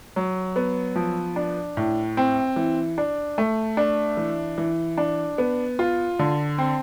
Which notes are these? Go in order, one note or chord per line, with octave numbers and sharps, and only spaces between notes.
F#3
B3
F3
D4
A2
C4
E3
D4
A3
D4
E3
E3
D4
B3
F4
D3
C4